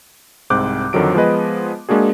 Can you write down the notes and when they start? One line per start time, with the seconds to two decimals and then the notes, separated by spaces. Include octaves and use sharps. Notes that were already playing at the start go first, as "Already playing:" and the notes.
0.50 C2 G#2 C4 D6 F#6 G6
0.93 F2 D3 D#3 F#3 D7
1.14 F3 G#3 B3 G#4 B4 D#5
1.89 G#3 A#3 D4 F#4 G#4